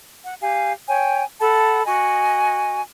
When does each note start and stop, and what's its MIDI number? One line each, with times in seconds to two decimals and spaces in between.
0.24 0.35 78
0.41 0.72 67
0.41 0.72 77
0.41 0.72 80
0.87 1.23 73
0.87 1.23 79
0.87 1.23 80
1.40 1.83 69
1.40 1.83 78
1.40 1.83 81
1.40 1.83 83
1.86 2.81 66
1.86 2.81 75
1.86 2.81 80